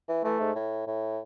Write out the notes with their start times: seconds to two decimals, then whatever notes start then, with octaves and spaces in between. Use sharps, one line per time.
0.08 E3
0.24 E3 A3
0.40 G#2
0.55 A2
0.87 A2